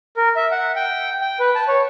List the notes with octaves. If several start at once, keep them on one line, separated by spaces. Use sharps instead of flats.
A#4
E5
F#5
G5
G5
B4
A5
C#5